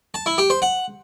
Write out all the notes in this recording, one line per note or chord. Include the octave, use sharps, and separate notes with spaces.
A5
E4
G4
C5
F#5